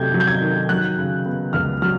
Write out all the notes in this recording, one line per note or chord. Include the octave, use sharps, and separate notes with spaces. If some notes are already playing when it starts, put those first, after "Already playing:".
Already playing: C3 D#3 F#3 A3 G6 G#6
F#3
G6
G#6
D#3
F#3 F#6
C#3
B3
C#2 F6
F#3 F6